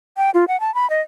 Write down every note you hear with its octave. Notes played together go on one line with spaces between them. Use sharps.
G5
F4
F#5
A5
B5
D#5